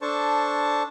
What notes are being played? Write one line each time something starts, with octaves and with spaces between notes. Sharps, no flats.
D4 A4 C5 A5 C#6